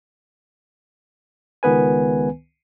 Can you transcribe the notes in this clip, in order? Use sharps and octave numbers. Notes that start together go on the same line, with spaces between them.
C#2 D#3 B3 B4 G#5